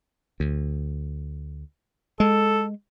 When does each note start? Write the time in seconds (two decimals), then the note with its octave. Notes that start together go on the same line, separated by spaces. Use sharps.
0.40 D2
2.20 G#3 A4